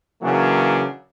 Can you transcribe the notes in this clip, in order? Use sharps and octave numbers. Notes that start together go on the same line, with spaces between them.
C#3 E3 F#3 A#3 D4